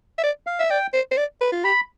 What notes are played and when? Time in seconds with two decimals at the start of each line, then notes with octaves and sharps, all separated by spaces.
0.18 E5
0.24 D5
0.47 F5
0.59 E5
0.70 D5 G5
0.93 C5
1.11 C5
1.17 D5
1.41 B4
1.52 F4
1.64 G4 B5